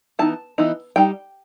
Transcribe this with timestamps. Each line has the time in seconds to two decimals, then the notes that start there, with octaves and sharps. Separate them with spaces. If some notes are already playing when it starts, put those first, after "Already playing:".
0.19 E3 B3 D#4 A5
0.58 E3 B3 D#4
0.96 G3 D#4 G5